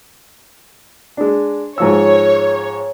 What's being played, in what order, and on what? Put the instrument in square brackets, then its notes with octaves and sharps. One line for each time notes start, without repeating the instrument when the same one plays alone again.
[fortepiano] G#3 D4
[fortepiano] G#2 F3 E6 [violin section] C#5